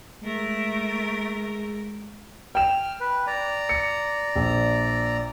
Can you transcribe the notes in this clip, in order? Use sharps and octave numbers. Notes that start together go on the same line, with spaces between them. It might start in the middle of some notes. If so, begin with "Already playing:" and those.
G#3 A3 A#4
G5 F6 E7
B4
D5 A#5
C#7
A#1